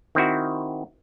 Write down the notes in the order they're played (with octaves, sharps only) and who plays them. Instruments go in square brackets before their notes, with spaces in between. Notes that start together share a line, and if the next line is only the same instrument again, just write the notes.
[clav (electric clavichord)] D#3 C4 E4 F#4